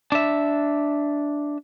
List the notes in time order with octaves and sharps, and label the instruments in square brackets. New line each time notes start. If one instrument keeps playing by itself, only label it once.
[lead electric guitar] D4 E5